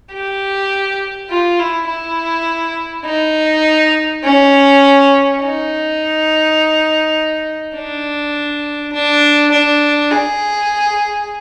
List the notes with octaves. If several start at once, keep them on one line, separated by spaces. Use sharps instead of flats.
G4
F4
E4
E4
D#4
C#4
D#4
D4
D4
D4
G#4